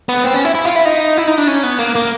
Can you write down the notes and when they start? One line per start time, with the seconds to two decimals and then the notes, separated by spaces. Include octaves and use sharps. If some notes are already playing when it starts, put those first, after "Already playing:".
0.09 B3
0.24 C4
0.34 C#4
0.45 E4
0.55 E4
0.65 F4
0.76 E4
0.85 D#4
1.17 E4
1.28 D#4
1.38 D4
1.48 C#4
1.63 B3
1.79 A#3
1.95 A#3